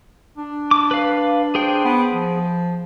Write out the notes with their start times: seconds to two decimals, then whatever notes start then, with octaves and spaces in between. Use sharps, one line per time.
0.37 D4
0.71 D6
0.91 B4 F5
1.55 G#4 C5 G5
1.84 B3
2.13 F3